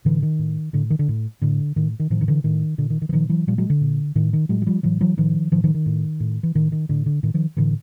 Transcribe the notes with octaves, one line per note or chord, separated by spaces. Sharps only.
A2 D3 E3
D#3
A2
A2 D3
D#3
D3
A2
A2 D3
A2 D#3
D#3
A2 D#3 F3
D#3
D3 E3
A2 D#3
A#2 D3
D#3
D#3
E3
A#2 D#3 F3
E3 F#3
A#2 F3 G3
F#3 G#3
D3
A#2
A2 D#3
D#3
A2 F#3 G#3
F#3
F3 G3
A2 E3 F#3
E3 F#3
A2 D#3 F3
A2 D#3 F3
D#3 F3
D#3
A2
A2
E3
A2 D#3
D#3
A2 D3
D3
A2 D#3
D#3 F3
A2 D3 E3